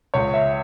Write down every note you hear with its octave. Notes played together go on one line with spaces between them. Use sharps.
C#2 C#5
E5